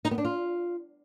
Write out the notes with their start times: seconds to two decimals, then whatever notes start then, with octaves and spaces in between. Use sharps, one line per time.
0.05 D#4
0.11 B3
0.18 D4
0.25 F4